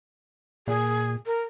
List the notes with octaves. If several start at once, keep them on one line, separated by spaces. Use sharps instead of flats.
A#2 G#4
A#4